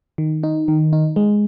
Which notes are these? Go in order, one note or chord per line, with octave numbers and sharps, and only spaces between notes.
D#3
D#4
D#3
D#4
G#3